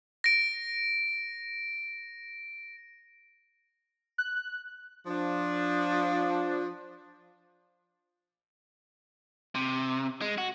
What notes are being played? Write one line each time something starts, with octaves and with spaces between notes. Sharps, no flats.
A#6 D7
F#6
F3 D4
C3
G#3
F#4